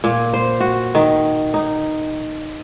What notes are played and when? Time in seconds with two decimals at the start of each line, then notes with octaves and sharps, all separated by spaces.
0.04 A#2
0.34 C5
0.60 F#4
0.95 D#3
1.54 D#4